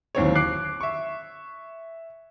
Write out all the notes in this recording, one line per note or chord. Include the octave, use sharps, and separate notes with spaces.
D1 D#2 C4 C#5
D6 F#6 C7
E5 C#6